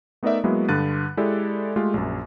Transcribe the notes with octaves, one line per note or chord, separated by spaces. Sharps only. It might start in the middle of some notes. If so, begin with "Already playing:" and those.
A3 B3 D#4 A#4 D5 E5
F#3 G#3 A#3 B3 E4
G2 D3 F#6 A6 D#7
G#3 E4 G4 A4 D5
G#3 A3 F4 G4 A4
A#1 F#2